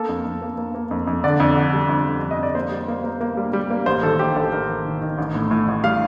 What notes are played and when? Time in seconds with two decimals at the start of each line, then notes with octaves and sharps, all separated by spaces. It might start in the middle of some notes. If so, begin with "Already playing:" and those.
Already playing: A#3 A4
0.09 F2
0.25 F2
0.41 A#3
0.58 A#3
0.75 A#3
0.91 F2
1.07 F2
1.24 D3 D5
1.40 F2
1.56 D3
1.73 G3
1.89 F2
2.06 G3
2.22 F2
2.31 D#5
2.39 F2 D5
2.55 A#3 C5
2.71 G3
2.88 A#3
3.04 A#3
3.21 A#3
3.37 G3
3.53 G3
3.70 A#3
3.86 A1 C5
4.03 D#3 A4
4.19 A1 G4
4.36 A1 A4
4.52 A1 A#4
4.69 A1
4.85 D#3
5.01 D#3
5.18 A1
5.35 A2
5.51 A2
5.68 A1
5.84 G3 F5